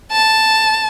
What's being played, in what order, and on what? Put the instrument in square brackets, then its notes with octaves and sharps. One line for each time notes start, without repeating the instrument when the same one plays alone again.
[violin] A5